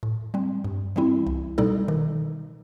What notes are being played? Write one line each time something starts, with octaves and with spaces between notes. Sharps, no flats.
A2
G3 C4
G2
E3 G3 C4 E4
C2
B2 G3 D#4 A4
D#3